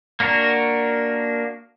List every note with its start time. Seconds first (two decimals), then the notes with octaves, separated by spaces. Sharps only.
0.20 A#3 D4 F#4 A#4